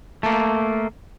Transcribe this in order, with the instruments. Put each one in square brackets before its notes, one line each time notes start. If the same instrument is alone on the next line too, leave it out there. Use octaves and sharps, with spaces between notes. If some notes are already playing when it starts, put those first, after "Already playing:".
[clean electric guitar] A3 A#3